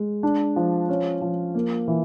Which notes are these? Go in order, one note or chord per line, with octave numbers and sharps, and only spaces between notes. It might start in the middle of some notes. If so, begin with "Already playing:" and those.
Already playing: G#3
D4
F3
C#4
F3
A#3
E3